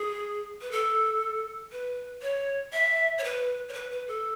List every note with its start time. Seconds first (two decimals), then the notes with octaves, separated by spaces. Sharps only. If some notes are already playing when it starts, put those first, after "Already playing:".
Already playing: G#4
0.61 B4
0.72 A4
1.72 B4
2.22 C#5
2.73 E5
3.18 C#5
3.24 B4
3.69 C#5
3.73 B4
3.91 B4
4.08 A4